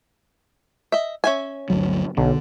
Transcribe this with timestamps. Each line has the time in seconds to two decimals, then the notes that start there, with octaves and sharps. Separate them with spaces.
0.92 D#5 E5
1.24 C#4 E5 G#5
1.70 G1 D2 F#3
2.17 B1 D3